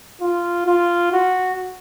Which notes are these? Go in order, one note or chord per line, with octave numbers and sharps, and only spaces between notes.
F4
F4
F#4